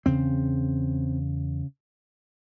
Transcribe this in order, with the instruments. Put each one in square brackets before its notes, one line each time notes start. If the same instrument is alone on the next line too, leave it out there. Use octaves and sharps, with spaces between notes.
[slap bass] E2 C#3 C4